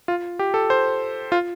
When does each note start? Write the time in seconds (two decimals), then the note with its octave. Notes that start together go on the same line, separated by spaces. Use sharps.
0.08 F4
0.39 G4
0.54 A4
0.70 C5
1.32 F4